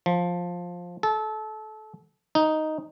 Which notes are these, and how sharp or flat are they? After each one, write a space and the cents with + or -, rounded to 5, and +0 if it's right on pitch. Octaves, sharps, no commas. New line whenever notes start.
F3 +10
A4 -25
D#4 +0